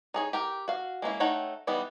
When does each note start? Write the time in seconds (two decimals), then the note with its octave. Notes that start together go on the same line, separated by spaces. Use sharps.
0.14 D#4 G#4 C#5
0.33 G4 A#4 G5
0.68 F#4 F5
1.02 G#3 A#3 C#4 E4
1.20 A3 D#4 C#5 F#5 G5
1.67 E3 G3 B3 D#4